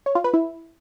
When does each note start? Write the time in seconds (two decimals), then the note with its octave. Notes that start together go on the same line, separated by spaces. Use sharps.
0.06 C#5
0.15 F4
0.24 B4
0.34 E4